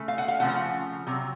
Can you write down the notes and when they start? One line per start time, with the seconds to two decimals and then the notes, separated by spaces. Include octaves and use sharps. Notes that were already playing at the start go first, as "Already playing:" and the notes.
Already playing: C#3 A3
0.08 F5
0.18 F#5
0.28 F5
0.40 C#3 F3 A3 F#5
1.07 C3 F#3